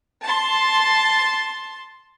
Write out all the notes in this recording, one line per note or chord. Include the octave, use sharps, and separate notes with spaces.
A5 C6